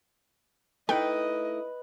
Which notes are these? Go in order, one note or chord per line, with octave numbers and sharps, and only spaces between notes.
A3 D#4 E4 B4 D#5 G5